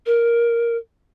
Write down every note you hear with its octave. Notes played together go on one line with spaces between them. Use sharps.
A#4